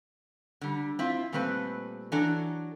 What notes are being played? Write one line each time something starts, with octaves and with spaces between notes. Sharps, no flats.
D3 G3
C4 E4 F4
A#2 G3 A3 C4 B4
E3 F#3 D4 A4 A#5